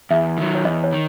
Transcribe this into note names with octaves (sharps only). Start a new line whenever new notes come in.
E2 E5
D#3 F#3
C#5
E2 D#5
C#5
D#3